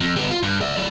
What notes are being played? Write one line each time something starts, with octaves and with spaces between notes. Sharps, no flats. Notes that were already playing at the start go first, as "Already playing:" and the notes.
F2
G3 B3
F4
G2
D5 E5
F#3 D5